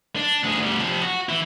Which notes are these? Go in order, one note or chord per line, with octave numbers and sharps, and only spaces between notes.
D4
D2 G#4
D2 G3
C3 F3
F#4
E3 E4